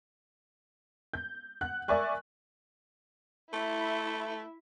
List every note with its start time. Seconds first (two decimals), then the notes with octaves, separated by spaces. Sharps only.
1.13 G6
1.61 F#5 F#6
1.88 A#4 D5 E5 G#5 C#6 F#6
3.53 A3 E4 E5